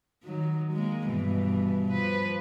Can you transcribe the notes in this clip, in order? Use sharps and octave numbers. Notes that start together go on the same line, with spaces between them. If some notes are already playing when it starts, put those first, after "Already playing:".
D#3 F#3
G#3 A#3
G2 B2 E3
F3 B4